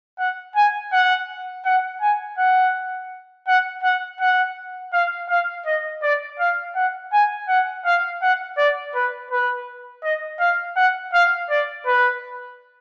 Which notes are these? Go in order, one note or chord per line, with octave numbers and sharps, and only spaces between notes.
F#5
G#5
F#5
F#5
G#5
F#5
F#5
F#5
F#5
F5
F5
D#5
D5
F5
F#5
G#5
F#5
F5
F#5
D5
B4
B4
D#5
F5
F#5
F5
D5
B4